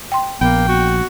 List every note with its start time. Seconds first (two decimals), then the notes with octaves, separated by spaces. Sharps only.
0.12 G5 C6
0.41 A#1 A#3 B3 G5
0.68 F#4